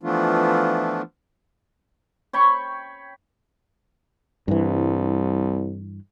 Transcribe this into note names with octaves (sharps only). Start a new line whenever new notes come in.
E3 F3 A3 B3 D4 F4
C#5 G5 B5 C#6
C2 G2 E3